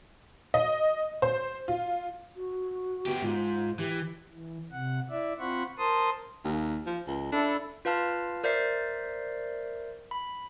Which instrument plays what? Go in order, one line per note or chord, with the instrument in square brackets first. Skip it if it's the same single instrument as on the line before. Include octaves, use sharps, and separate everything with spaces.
[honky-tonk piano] D#5
C5
F4
[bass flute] F#4
[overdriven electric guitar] B3 G4
[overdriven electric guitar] G#2 [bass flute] F4
[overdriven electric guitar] E3 [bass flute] G4
[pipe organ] E3
C3 F#5
E4 D5 E5
C4 F4 C5 F#5 B5 C#6
A#4 C5 A5 C6 D#6
[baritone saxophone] D#2
F3
C#2
[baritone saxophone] D4 [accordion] E4 A4
[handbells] F4 B4 F5 A5 F6
A#4 C5 D5 E5 C7
B5